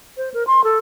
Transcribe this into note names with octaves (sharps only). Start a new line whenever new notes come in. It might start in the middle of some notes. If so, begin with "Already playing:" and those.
C5
A#4
C6
A4